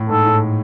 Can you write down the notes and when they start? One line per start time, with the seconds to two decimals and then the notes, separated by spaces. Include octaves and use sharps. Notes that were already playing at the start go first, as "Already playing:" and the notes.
Already playing: A2
0.09 G#2 A4
0.25 A2